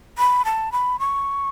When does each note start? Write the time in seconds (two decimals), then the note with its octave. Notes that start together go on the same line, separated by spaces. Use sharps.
0.18 B5
0.45 A5
0.72 B5
0.99 C#6